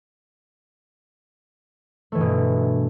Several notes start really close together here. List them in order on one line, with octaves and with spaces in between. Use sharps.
A3 E3 G2 B2